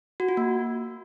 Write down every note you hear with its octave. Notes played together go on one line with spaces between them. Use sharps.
F#4
F4
A#3